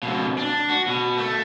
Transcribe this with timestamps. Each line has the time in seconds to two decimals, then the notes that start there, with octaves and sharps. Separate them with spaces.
0.03 F2 B2
0.38 D4
0.70 F#4
0.87 B2
1.18 A3